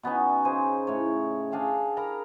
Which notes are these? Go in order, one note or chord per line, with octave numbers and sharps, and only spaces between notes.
B2 B3 C#4 D#4
C#3 C5 G#5
A2 C#5
D4 G#4 F5 G5
A#4 A#5 B5